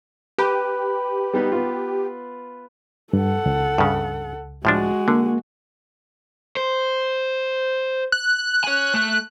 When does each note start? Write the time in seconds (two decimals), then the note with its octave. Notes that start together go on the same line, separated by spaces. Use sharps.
0.38 G4 B4
1.33 G3 B3 D#4
1.52 B3 F4
3.13 G2 A4 F#5
3.46 C#2
3.78 G2 C#3
4.65 A2 F3 G#3 D4 F#4
5.08 D3 A#3
6.57 C5
8.12 F#6
8.64 C#5 G#5
8.94 A3